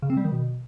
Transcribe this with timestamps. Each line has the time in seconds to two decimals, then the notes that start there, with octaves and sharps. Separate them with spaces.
0.02 C#3
0.10 C4
0.17 G3
0.25 D#3
0.32 B2